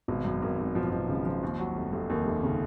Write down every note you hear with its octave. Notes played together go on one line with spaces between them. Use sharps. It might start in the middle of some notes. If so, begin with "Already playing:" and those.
G#1 B2
F#2
G#1 D#3
G#1
B2 F3
G#1 B2
G#1 C#3
F3
D#2
F#3
F1
F1
D#2 D#3
F1
C#3